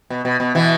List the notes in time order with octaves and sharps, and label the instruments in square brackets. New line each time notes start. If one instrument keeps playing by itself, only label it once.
[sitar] B2
B2
B2
B2 E3